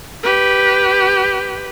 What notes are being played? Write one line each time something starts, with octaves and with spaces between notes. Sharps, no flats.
G4 B4